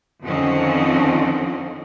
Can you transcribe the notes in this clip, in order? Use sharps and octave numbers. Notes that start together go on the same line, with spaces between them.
F2 D3 D#3 F3 C4 C#4